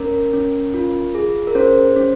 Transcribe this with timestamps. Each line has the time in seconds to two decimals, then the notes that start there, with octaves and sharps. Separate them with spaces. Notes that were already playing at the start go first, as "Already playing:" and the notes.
Already playing: C#4 A#4
0.33 C#4
0.74 F4
1.15 G#4
1.47 A#4
1.55 C#4 C5
1.96 C#4